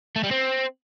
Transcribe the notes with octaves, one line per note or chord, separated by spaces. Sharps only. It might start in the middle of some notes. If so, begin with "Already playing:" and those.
A3
G3
C4